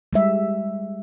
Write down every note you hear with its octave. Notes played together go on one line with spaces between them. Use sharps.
G3 G#3 E5